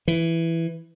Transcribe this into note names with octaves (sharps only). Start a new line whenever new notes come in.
E3